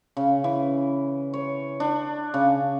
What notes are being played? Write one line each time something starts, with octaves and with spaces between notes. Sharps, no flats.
C#3
E3
C#5
D4
C#3